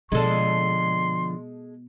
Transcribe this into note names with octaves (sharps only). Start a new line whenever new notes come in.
B2 D3 F3 G#3 A4 D5 C6